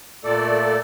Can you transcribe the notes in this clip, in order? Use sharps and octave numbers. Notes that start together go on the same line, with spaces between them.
A#2 A3 A4 D5